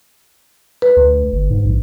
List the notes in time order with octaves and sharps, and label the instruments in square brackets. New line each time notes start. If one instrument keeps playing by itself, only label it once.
[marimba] B4
[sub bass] D2
G1
G#2
A#1